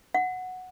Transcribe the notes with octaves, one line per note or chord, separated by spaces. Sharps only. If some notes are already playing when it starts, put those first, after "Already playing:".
F#5